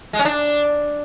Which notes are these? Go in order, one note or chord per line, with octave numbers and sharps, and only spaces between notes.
G#3
C#4
D4